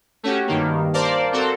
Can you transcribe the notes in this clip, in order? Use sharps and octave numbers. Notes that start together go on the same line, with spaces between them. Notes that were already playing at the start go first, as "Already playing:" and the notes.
A3 C#4 F#4 G4
G2 D#3 A#3
A#4 C5 D5 F5 A5
C4 F#4 A4 A#4 C5